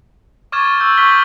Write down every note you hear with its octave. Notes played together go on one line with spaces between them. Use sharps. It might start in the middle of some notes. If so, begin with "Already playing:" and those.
C#6 D6 F6 G#6 A6 E7
C#6 E6 G6
C#6 F6 G6 B6 G7